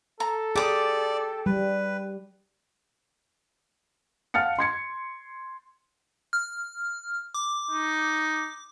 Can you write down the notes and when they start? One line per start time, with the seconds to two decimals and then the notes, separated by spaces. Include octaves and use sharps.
0.20 A4 A#5
0.56 G4 G#4 D5 D6 D#6
1.46 G3 B4
4.34 F5 F#5 A5 F6 A6 C#7
4.59 C6 G#6 C#7
6.33 F6
7.34 D6
7.71 D#4